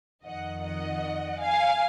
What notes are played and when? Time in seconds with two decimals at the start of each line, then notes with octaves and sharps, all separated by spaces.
0.24 F2 D#3 D#5 F#5
0.63 D#5 F#5
1.40 F5 G#5